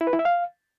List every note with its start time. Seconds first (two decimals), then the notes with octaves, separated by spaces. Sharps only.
0.01 E4
0.07 B4
0.13 E4
0.19 E5
0.25 F5